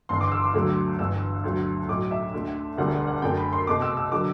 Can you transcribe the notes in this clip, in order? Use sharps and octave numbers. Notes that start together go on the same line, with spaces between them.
G1 G2 E3 C6
D6
E6
D6
D2 D3 F#3 A3
G1 G2 E3 E6
D2 D3 F#3 A3
B1 A2 F#3 D6
E5
D2 D3 A3
E1 D2 D3 G3 F#5
F#5
F#2 D3 A3 G5
B5
C6
C2 B2 A3 D6
E6
E6
D3 F#3 D6